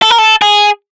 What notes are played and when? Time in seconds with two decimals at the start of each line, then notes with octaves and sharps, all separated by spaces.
0.02 A4
0.10 A#4
0.18 A4
0.42 G#4